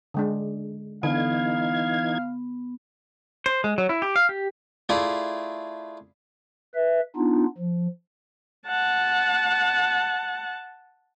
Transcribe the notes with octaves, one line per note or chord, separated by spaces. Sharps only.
D3 G#3 D4
D3 E3 B3 D#4 F5 G#6
C5
G#3
F#3
E4
G4
F5
G4
A3 E4 F4 G#4 D5
B4 E5
B3 D4 D#4 F4
F3
F#5 A5